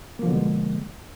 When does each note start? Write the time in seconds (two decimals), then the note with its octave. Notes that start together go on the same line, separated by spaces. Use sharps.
0.19 A#3
0.23 F3
0.27 D3
0.31 B2
0.34 G#3